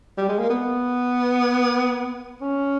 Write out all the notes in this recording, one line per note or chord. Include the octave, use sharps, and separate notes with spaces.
G3
G#3
A#3
B3
C#4